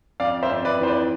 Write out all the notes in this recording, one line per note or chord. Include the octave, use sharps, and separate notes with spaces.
F2 D5 F5
C5 E5
F2
B4 D5
E3 C5
B4 D5